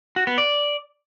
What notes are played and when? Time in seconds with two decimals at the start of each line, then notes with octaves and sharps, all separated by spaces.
0.16 F#4
0.27 B3
0.38 D5